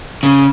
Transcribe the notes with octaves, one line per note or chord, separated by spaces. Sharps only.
C#3